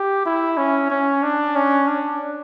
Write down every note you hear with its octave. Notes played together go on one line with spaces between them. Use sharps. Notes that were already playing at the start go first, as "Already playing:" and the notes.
Already playing: G4
E4
C#4
C#4
D4
C#4
D4